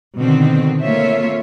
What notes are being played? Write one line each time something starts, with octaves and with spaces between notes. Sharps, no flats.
B2 D3 D#3 C4
A3 A#3 F4 C#5 E5